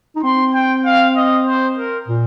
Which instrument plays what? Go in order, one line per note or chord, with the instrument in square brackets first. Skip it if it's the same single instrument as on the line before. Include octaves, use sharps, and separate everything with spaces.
[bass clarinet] D#4
[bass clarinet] C4 [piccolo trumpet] C6
[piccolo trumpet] G5
F5
D#5
C5
A#4
[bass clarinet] A#2